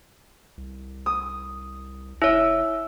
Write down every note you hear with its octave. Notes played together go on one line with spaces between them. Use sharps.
C2
D#6
F1 E4 C#5 E5